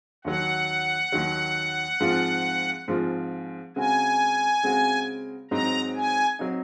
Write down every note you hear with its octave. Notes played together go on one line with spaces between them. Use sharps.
D#2 D#3 F#3 F#5
D#2 D#3 F#3
G#2 F3 G#3 C4 F4
G#2 F3 G#3 C4 F4
C#3 G#3 C4 F#4 G#5
C#3 G#3 C4 F#4
G#2 F#3 C4 D#4 A#5
G#5
F#3 C4 D#4